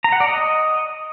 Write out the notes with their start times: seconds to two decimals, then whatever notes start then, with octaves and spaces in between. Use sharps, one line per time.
0.04 A#5
0.12 F#5
0.20 D5
0.28 D#5